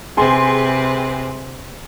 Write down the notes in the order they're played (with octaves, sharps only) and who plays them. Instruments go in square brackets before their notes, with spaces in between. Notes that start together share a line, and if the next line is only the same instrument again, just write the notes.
[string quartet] C3 C4 B4 [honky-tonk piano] G#4 G#5 C6